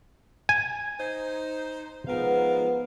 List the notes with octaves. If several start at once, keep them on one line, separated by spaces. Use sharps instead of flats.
G#5
D#4 C5
G#2 F3 G#3 B3 A#4 F5